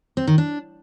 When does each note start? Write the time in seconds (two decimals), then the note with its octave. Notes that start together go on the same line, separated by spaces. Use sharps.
0.17 C4
0.27 D#3
0.38 D4